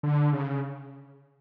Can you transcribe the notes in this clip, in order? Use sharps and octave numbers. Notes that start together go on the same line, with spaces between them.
D3
C#3